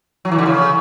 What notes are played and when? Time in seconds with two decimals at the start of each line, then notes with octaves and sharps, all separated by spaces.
0.25 F#3
0.31 E3
0.38 D3
0.46 C#3